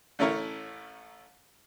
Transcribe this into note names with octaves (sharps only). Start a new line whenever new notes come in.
A1 A3 C#4 E4 A#4 C#5